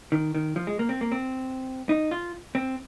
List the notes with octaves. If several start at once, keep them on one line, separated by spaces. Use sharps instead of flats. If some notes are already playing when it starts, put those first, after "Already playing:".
D#3
D#3
F3
G#3
A#3
C4
A#3
C4
D#4
F4
C4